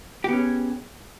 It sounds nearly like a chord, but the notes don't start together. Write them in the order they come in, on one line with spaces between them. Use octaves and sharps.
G4 B3 C#4 G#4